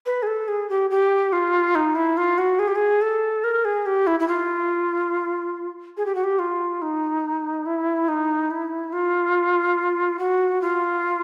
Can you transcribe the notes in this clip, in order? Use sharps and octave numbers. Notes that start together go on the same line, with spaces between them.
B4
G#4
A4
G#4
G4
G4
F4
D#4
E4
F4
F#4
G#4
G4
G#4
A4
A#4
G#4
G4
E4
E4
F4
G#4
G4
F#4
G4
F4
D#4
E4
D#4
E4
F4
F#4
F4